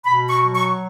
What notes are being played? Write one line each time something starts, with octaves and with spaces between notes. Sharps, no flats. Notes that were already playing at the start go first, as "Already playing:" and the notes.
B2 B5
C#6
F#3
C#6